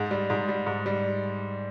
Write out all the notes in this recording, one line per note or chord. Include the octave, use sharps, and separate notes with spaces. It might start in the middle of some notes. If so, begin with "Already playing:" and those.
Already playing: G#2
G3
G#2
G3
G#2
G3